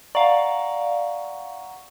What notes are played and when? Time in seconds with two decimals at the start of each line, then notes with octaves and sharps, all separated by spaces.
0.15 D5 F5 F#5 A#5 C#6